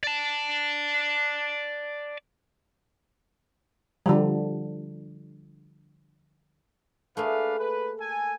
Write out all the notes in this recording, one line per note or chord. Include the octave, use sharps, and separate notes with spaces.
D5 A5
D3 F3 G3
A3 A#3 D4 G#4 B4 F5
B4
A4 G#5